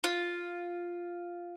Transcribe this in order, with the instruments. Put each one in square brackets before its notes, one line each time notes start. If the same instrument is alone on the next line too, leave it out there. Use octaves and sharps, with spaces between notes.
[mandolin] F4